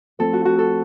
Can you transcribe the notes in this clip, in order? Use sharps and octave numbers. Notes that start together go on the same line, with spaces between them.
F3 A3 C4 A4
F#4
F#4
A4